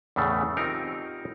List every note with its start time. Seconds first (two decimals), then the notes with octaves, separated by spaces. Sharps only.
0.16 E2 A2 C#3 A3
0.57 C4 D#4 F4 G4 A#4